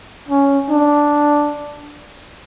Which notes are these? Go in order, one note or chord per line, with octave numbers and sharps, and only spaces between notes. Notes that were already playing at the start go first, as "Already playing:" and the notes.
C#4
D4